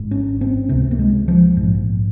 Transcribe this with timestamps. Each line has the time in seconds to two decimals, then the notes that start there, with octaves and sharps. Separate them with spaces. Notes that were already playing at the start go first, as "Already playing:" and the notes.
Already playing: G#1 G#2
0.11 C#4
0.41 C4
0.69 C#2 C3 C4
0.91 A#3
0.99 G#3
1.28 F3
1.57 A#1 G#2